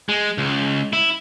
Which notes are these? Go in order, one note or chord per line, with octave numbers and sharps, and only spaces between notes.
G#3
C#2
E4